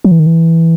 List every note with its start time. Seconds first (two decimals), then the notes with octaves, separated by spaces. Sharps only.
0.04 F#3
0.11 E3
0.20 D#3
0.26 E3